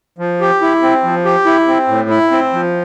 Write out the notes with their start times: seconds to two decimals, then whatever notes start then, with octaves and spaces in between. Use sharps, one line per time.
0.18 F3
0.41 G4
0.61 E4
0.82 C4
1.04 F3
1.25 G4
1.46 E4
1.68 C4
1.88 A2
2.10 E4
2.31 C4
2.53 F3